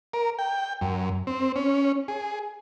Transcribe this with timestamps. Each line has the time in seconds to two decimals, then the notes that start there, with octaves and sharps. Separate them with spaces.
0.14 A#4
0.39 G5
0.81 F#2
1.27 C4
1.56 C#4
2.08 G#4